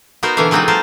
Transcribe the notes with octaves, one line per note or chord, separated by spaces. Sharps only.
B3 D#4 F#4 A#4 C5
B2 D3 E3 A#3 E5 F5
F#3 G#3 C4 D#4 F4 F#4
A#4 C5 F5 A5